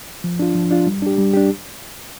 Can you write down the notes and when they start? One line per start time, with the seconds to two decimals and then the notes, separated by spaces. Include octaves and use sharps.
0.24 F3
0.39 D4 F4
0.55 F3
0.71 D4 F4
0.87 G3
1.02 D4 G4
1.18 G3
1.34 D4 G4